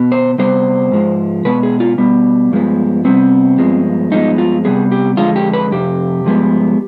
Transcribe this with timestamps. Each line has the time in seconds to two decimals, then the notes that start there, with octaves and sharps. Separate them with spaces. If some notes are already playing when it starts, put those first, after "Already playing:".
Already playing: B2 B3
0.12 C5
0.38 C3 G3 B3 C5
0.92 G#2 F3 G#3
1.45 B2 G#3 B3 B4
1.63 G#4
1.80 F4
1.98 B2 G3 B3
2.52 G2 F3 G#3 B3
3.05 C3 G3 B3 C4
3.58 G2 F3 G#3 B3
4.11 G2 F3 G#3 B3 D#4
4.38 F4
4.65 C3 G3 B3 G#4
4.92 G4
5.17 F2 D3 G#3 F4
5.36 G4
5.53 B4
5.71 F2 C3 G4
6.24 G2 F3 G#3 B3